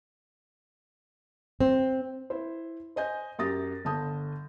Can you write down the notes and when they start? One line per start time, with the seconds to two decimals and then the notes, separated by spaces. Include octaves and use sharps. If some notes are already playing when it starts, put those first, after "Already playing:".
1.60 C4
2.30 E4 C5
2.96 C5 D#5 G#5 G6
3.39 F#2 G4 D#6 A6 A#6
3.85 G1 D3 A5 D#6 G6